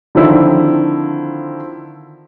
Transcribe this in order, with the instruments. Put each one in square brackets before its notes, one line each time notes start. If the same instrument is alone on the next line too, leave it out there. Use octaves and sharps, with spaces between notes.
[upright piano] D3 D#3 F3 C4 E4